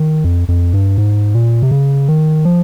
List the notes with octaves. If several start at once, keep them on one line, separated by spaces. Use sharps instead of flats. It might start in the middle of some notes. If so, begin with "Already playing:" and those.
Already playing: D#3
F2
F2
G2
G#2
A#2
C3
C#3
D#3
F3